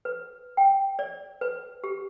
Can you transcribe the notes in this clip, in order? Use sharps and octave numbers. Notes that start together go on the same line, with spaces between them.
B4
G5
D5
B4
G4